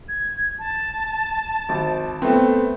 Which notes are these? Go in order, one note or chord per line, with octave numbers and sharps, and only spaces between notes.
G#6
A5
G#1
A3 B3 C4